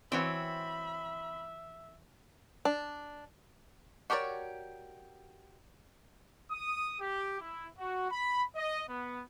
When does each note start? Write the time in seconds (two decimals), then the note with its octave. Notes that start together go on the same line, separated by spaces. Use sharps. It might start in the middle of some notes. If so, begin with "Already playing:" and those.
0.12 E3 C4 F#4 C#5 E5 B5
2.65 D4
4.10 F#4 G4 A#4 C#5 D5
6.51 D#6
7.00 G4
7.41 E4
7.78 F#4
8.11 B5
8.56 D#5
8.89 B3